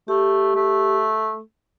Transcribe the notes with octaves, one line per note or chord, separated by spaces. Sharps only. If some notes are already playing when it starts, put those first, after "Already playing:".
A3 G4
A3